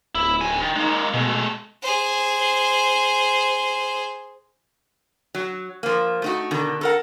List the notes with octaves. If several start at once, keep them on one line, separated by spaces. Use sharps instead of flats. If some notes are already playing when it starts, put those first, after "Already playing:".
D1 E4
D#3 G#5
D#3
G#3 A#3 D#4
B2 G#3 A3
G#4 C5
F#3
F3 A#3
A3 D#4 F#4
B2 D3 D#3
A4 A#4 F#5